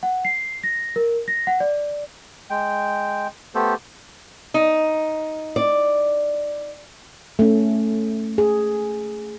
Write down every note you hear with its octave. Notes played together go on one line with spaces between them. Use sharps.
F#5
C7
A#6
A#4
A#6
F#5
D5
G#3 G5
A3 B3 G4 A4 C5
D#4
D5
A3 C#4
G#4